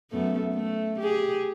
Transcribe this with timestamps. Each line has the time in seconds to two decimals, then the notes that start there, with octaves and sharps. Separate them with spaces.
0.11 F#2 A3 B3
0.54 A3
1.00 G4 G#4